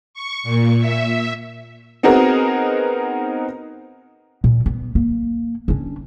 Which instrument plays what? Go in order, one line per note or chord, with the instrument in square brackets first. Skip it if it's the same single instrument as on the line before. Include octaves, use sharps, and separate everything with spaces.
[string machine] C#6
A#2
E5
[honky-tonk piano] B3 C4 D#4 F#4 G#4 A#4
[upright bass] A#2
B3
A#3
C#4 D4